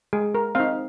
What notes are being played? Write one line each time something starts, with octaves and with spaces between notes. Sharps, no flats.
G#3 G#4
A#4
C4 D#4 F5